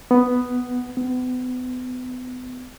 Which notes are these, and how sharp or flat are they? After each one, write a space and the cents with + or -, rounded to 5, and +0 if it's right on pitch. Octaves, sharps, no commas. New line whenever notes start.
B3 +5
B3 +35